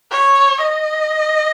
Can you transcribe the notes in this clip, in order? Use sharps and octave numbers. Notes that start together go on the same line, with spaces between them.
C#5
D#5